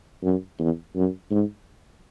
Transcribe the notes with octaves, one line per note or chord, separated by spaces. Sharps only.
F#2
E2
F#2
G#2